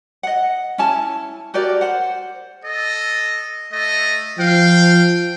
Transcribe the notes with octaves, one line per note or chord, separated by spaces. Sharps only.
D#5 F#5
C#4 E4 G#5 A5
F#4 G4 A#4 D5
C5 F#5
A4 D#5
A3 D#5
F3 F5 G5